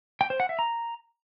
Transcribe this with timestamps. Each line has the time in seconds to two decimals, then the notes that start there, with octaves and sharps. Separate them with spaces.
0.21 G5
0.30 C5
0.40 F#5
0.49 E5
0.59 A#5